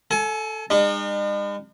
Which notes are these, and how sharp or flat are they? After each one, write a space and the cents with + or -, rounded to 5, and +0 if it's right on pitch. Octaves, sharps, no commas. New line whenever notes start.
A4 +0 G#5 +35
G#3 -45 D#4 -45